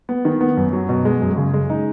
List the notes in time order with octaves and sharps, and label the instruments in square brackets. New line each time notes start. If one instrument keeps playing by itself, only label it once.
[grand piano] B3
D#3
B3
F#2
F#3
B2
G#3
F#2
C#3
G#3
D#4